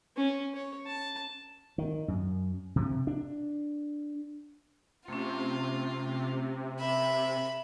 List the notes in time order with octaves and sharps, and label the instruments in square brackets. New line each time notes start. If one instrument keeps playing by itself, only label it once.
[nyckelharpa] C#4
C#5
A5
[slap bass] D#3
F#2
C3 F3
D4
[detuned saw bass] C3 [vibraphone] A3 C#4 [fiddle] F4
[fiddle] E5 B5